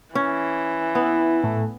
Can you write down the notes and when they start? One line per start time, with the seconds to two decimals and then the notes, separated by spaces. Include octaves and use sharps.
0.15 E3 C#4
0.95 B3 E4
1.44 A2 A3